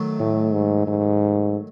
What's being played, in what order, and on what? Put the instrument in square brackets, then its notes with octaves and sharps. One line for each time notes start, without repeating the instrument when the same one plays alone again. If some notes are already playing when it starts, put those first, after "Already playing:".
Already playing: [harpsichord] D#3 F#3 A3
[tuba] A2
G#2
G#2